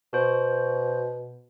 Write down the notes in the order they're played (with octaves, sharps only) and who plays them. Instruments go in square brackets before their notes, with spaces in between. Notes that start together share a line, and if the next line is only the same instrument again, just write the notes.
[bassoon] B2 [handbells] F#4 C5